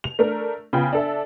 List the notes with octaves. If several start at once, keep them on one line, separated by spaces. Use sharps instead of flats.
F7
A3 D4 A#4
C#3 B3 F4 G5 B5
D4 A4 E5